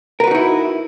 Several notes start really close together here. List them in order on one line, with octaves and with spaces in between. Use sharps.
A#4 B4 F#4 D#4 E4